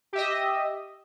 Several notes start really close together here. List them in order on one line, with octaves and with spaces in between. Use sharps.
G4 E5 D#5